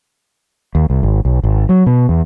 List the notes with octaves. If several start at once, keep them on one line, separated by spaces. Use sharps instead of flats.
D#2
C2
G#1
B1
G#1
F#3
B2
E2